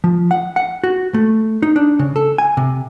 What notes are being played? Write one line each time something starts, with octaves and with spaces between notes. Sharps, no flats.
F3
F#5
F#5
F#4
A3
D#4
D4
C#3
A4
G#5
C3